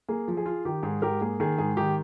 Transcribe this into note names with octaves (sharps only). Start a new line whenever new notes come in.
A#3 G#4
F3
G#4
F4
D#3 G4
G#2 G#4
G#2 G4 A#4
A#3 G#4
D#3 G#4
G#2 G#4
D#3 G4